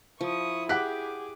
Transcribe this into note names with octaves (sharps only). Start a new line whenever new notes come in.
F3 E4 C#6 D#6
G4 G#4 F#5 D6 F#6 B6